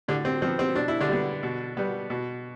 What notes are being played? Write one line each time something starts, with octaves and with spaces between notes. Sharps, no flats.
A2 D3 D4
C4
F3 B3 C4
C4
B2 D4
E4
D3 D4
G3 B3
B2
G3 B3
B2